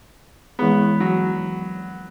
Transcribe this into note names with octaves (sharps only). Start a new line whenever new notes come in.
E3 G#3 B3 E4 G#4
F#3